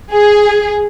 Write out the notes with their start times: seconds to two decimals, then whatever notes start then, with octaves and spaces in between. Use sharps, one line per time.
0.11 G#4